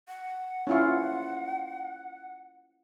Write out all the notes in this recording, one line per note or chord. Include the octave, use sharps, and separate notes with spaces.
F#5
C#4 E4 F4